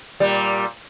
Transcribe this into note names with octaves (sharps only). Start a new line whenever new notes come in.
A#2 G3